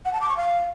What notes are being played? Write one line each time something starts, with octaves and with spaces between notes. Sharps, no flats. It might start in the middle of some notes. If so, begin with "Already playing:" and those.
F#5
A5
D6
C#6
F5